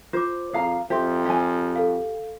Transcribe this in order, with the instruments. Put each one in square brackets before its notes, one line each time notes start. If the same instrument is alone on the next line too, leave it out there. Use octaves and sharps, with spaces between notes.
[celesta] F4 D6 [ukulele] C5
[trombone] F2 [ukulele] G#4 F5 A#5
[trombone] F2 [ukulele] G4 [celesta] C5 E5 C6
[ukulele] G4 G#5
[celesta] A4 F5